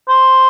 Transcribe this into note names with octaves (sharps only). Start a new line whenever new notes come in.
C5